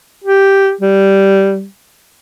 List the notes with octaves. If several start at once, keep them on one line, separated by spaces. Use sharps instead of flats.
G4
G3